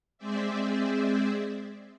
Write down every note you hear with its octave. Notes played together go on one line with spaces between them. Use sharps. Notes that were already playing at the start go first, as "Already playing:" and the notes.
G#3 C4 G#4 C5 D5 E5